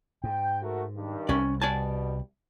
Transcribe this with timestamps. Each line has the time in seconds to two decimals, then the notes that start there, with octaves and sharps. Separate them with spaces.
0.24 G#2 G5
0.62 A3 F#4 A#4
0.96 G2 D#3
1.29 C2 C#4 D5
1.61 B2 G3 D5 G#5 A5